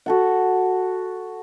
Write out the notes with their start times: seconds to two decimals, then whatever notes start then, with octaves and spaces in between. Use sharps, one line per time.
0.06 F#4 A4 F#5